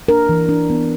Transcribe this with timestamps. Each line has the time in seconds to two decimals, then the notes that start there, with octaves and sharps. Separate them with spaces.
0.08 D4 A#4
0.29 E3
0.49 D4
0.70 B3